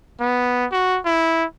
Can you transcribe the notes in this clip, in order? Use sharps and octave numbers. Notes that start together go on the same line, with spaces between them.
B3
F#4
E4